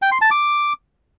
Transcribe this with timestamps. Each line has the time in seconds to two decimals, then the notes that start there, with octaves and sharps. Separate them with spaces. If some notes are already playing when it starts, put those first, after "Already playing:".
0.02 G5
0.12 C6
0.21 A5
0.31 D6